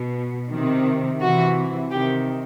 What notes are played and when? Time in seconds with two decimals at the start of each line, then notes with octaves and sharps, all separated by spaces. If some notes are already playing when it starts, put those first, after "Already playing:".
Already playing: B2
0.50 C3 D#3
1.21 C3 E3 F#4
1.91 C3 D#3 G4